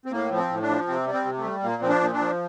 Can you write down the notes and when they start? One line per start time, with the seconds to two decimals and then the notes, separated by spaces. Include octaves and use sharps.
0.06 C4
0.12 A2 A#3
0.31 F3
0.38 C4
0.50 A2
0.62 D4
0.69 F3
0.88 C3 C4
1.06 G3
1.13 C4
1.25 C3
1.38 A3
1.44 G3
1.63 A#2 A#3
1.81 F3 C4
1.89 D4
2.01 A#2
2.13 D4
2.20 F3